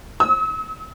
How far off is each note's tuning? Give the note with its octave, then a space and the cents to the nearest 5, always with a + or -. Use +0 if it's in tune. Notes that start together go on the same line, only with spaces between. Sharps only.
E6 -45